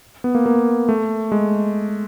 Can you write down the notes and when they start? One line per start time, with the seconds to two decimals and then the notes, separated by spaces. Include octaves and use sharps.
0.24 B3
0.35 A#3
0.46 A#3
0.89 A3
1.32 G#3